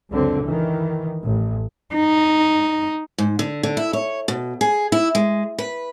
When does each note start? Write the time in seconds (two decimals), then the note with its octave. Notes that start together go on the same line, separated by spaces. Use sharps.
0.11 C#2 F#2 D3 C4
0.46 D#3 E3
1.23 A1
1.95 D#4
3.18 G#2
3.39 D3
3.63 D3
3.77 E4
3.93 C#5
4.28 B2
4.61 G#4
4.92 E4
5.15 G#3
5.58 B4